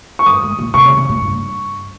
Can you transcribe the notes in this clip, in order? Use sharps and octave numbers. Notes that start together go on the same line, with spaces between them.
C#6
G2 D#6
G#2
A#2
C3 C#6
C#3
C3
A#2
G2